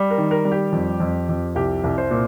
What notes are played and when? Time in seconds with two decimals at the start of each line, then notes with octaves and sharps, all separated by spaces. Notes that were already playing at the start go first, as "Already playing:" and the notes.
Already playing: G3
0.11 A#4
0.18 D#3
0.31 A#4
0.45 G3
0.52 G4
0.72 F2
1.00 F2
1.29 F2
1.55 C2 G4
1.84 C2
1.98 C5
2.11 A#2